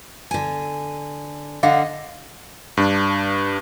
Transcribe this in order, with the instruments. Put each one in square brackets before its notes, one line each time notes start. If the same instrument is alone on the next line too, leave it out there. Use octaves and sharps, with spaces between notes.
[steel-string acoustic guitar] D3 G#5
[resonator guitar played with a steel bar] D3 F5 F#5 [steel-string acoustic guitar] D#5
[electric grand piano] G2 D4